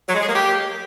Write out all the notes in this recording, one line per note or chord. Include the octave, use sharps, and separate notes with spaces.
F#3
G#3
G#4
A#3
G4